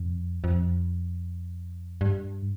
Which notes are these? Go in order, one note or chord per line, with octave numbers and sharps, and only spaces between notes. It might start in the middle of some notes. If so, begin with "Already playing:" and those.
Already playing: F2
F2
G2